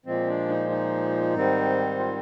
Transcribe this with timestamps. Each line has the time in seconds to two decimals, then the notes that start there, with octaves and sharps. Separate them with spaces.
0.06 A#2 F3 G#3 C4
0.28 D4
0.49 D#4
0.70 D#4
1.34 G#2 D#3 G3 C4
1.99 F4